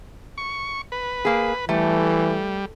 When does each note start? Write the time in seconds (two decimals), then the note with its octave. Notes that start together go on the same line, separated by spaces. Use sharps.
0.38 C#6
0.92 B4
1.25 A#3 G#4
1.69 E3 G3 A3